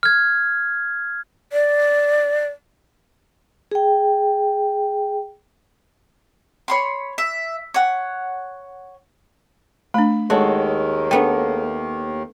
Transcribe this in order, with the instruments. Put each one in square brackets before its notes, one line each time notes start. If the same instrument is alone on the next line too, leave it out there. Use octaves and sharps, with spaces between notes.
[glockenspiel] F6 G#6
[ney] D5
[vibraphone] G#4 G5
[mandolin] C#5 B5 C6
E5
C#5 F#5
[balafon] A3 D4 [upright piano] B5
[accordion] D#2 D#3 [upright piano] G#3 A4 C#5 [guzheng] F#4
[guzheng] A3 B3 D4 [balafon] G5